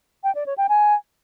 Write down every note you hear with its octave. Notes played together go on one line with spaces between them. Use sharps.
G5
D5
C#5
G5
G#5